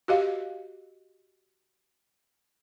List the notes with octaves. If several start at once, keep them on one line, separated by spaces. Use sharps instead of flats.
F#4 G4 D#5 F5